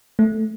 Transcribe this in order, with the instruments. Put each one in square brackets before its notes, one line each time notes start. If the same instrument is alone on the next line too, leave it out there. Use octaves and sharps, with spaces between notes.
[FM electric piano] A3